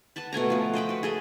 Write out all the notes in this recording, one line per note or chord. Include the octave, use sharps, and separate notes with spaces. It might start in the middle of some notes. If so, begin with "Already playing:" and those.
B4 F#5 A5 B5
B2 A3 G#5 A#5
F3 B4
C5 D#5 G5 B5
F#4 B4
G#4 A4 D#5 E5